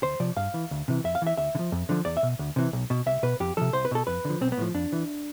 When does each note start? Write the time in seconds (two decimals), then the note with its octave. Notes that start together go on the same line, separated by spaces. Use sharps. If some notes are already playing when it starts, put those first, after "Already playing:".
0.03 D2 C5
0.20 C3 F3 D5
0.37 G2 F5
0.54 E3
0.71 D2
0.88 C3 E3
1.04 F2 E5
1.15 F5
1.22 E3 E5
1.37 D2 E5
1.55 D3
1.59 F3
1.72 F2
1.89 D3 F3
2.05 E2 D5
2.17 E5
2.23 B2
2.39 D2
2.56 C3 E3
2.73 B1
2.90 B2
3.06 C2 E5
3.23 B2 B4
3.40 F2 G4
3.57 C3 F3 A4
3.73 C2 C5
3.85 B4
3.91 B2 A4
4.07 F2 B4
4.25 D3 F3
4.41 B1 C4
4.52 B3
4.58 A2 F3
4.74 F2 D4
4.92 E3